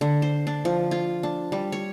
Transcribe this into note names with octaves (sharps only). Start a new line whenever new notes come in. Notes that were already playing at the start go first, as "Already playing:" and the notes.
D3
C5
D4
F3
F4
D4
G3
C#5